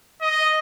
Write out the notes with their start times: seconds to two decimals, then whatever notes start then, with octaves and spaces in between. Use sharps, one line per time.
0.21 D#5